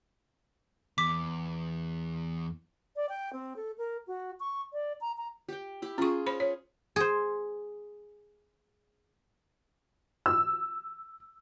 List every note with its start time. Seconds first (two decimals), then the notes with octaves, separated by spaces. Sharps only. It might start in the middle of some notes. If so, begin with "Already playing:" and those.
0.98 E2 D6 B6
2.96 D5
3.09 G5
3.33 C4
3.56 A4
3.78 A#4
4.07 F#4
4.40 C#6
4.73 D5
5.01 A#5
5.18 A#5
5.48 G4 G5
5.82 E4 G4
5.98 C#4 F4 G#4 C#6
6.27 C5 C#5 B5
6.40 G#4 C#5
6.96 G#4 C5
10.26 E6